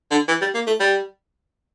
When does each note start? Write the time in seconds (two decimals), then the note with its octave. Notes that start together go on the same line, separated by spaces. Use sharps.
0.11 D3
0.28 E3
0.41 G3
0.55 A#3
0.67 A3
0.80 G3